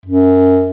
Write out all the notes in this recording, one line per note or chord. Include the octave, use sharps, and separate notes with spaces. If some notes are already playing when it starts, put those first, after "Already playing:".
F#2